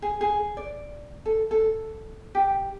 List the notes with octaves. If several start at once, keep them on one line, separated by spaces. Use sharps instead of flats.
G#4
G#4
D5
A4
A4
G4